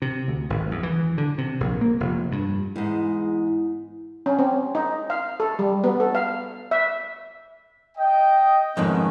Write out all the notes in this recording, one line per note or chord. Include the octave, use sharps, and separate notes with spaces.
C3
D2
G#1
E2
E3
D3
C3
A#1
A#3
F1
G2
E2 G#2
C#4
C4
D#4
F5
A4
G3
B3
A4
F5
E5
D#5 G5
F2 G#2 D#3 A3 B3 C#4